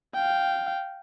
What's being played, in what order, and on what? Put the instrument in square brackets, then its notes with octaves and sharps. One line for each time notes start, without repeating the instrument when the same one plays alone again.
[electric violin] F5 G5